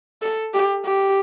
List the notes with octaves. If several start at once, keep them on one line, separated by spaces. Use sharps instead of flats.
A4
G4
G4